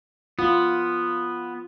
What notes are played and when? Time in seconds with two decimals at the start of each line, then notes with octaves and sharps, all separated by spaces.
0.39 B3 F4